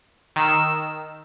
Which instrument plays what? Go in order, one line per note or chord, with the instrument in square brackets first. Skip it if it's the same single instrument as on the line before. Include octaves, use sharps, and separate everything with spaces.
[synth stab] D#3 E6